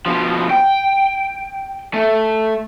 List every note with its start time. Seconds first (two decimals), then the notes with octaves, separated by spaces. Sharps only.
0.06 B2 F3
0.51 G5
1.94 A3